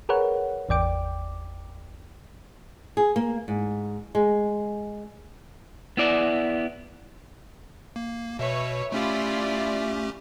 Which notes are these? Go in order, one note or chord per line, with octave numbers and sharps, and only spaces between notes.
G#4 A#4 B4 C#5 F#5
G#1 E2 D5 G5 D6
G#4
A#3
G#2
G#3
B3 E4 D5
A#3
B2 B4 C#5 E5
A3 C#4 E4 F4 G4 D5